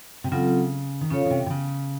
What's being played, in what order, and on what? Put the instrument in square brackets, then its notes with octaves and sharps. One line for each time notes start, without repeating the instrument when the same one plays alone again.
[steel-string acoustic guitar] C3
[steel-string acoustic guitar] C#3 [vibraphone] F#3 C4 F4 A4
[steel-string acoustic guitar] D#3
[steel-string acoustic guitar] C#3 [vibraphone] C#4 F4 A4 C#5 F5
[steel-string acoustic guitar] C#3
C3
C3
C#3